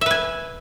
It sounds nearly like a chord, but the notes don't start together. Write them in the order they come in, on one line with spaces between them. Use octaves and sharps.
E5 B4 G#5